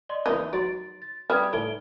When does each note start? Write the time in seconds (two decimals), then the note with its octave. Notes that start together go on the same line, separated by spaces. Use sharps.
0.09 D5 D#5 C6
0.26 E3 A#3 D#4
0.53 F#3 C6 A6 D7
1.02 A6
1.30 G3 B4 D#6 G#6
1.53 A2 D#4 D7 G7